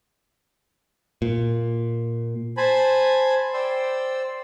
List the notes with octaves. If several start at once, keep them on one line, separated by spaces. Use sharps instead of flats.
A#2
C5 G#5 A5 B5
C5 D5 G5 C6 E6